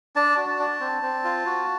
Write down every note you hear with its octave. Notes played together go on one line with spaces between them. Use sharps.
D4 A5
F#4
D4
C4
C4
F4
F#4